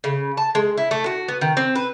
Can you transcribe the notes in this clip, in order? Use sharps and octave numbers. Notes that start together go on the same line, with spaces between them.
C#3
A5
G#3
E4
A3
F#4
B3
D#3
C4
B4